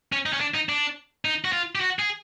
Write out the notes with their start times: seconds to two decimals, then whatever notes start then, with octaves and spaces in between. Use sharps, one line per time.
0.12 C#4
0.26 D#4
0.33 C#4
0.40 D4
0.54 D#4
0.69 D4
1.25 D#4
1.45 F#4
1.53 F4
1.75 G4
1.81 F#4
1.99 G#4